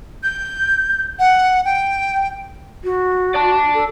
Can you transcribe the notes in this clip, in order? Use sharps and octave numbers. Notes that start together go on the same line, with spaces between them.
G6
F#5
G5
F#4
D5 A5
A4